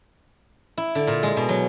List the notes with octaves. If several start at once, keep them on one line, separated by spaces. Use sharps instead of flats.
E4
D3
A#2
G#3
B2
F#3